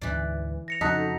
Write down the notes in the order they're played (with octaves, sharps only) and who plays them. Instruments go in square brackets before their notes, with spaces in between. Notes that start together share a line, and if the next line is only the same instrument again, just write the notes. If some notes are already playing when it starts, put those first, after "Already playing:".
[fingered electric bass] D2 G#2 D3 [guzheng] E3 D5
[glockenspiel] A#6 C#7 F7
[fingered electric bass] F2 C#3 [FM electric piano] D#4 A4 D#5 [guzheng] F#4 [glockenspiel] B6